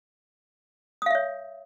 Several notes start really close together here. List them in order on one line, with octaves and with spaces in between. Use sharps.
D#6 F5 E5 C#5